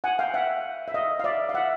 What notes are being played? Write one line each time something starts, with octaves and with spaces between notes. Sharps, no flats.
F#5 G#5
F5 G5
E5 F#5
E5
D#5 F5
F5
D5 E5
F5
E5 F#5